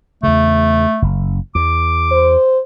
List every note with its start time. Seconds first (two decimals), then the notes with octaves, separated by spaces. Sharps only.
0.23 E2 C#3 A3
1.02 F#1
1.55 E2 D6
2.12 C5